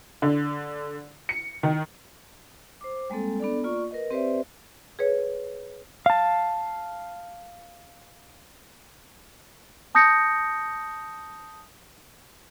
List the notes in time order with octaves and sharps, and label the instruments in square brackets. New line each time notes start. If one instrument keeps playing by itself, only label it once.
[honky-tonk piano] D3
C#7
D#3
[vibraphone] C5 D6
G3 G#3 A#3 C4 A4
B3 D4 A4 D5
A#3 F4 D5 C#6
A#4 B4 D#5
C4 G4 B4 C5 D5 E5
[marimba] G#4 B4 C#5
[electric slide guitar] F5 A5
[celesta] A5 D#6 G6 A#6 C#7